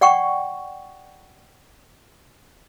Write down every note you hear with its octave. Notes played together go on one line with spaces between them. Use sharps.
D5 F#5 G5 C#6